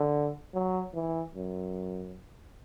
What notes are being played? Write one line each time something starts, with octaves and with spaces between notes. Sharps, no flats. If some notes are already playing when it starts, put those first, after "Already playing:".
Already playing: D3
F#3
E3
F#2